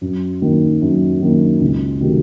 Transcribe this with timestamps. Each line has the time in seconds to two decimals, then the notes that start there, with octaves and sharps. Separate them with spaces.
0.01 F#2
0.42 D#3 F#3 A#3
0.81 F#2
1.21 D#3 F#3 A#3
1.61 C#2
2.01 C3 D#3 F#3 A3